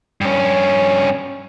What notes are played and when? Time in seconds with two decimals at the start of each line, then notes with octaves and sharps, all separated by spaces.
0.21 G2 C#4